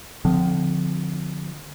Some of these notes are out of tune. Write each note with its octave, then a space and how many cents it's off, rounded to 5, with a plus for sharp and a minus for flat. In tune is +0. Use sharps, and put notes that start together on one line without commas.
D3 +0 F3 +20 C4 -35